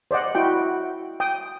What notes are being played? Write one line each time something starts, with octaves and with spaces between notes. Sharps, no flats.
C5 D5 D#5 F#5
E4 F#4 G5
G5 D#6